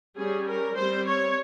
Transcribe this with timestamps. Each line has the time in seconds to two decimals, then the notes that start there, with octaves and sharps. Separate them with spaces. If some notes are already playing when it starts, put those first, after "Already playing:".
0.16 G3 C#4 G#4
0.46 A#4
0.76 G3 C4 C5
1.06 C#5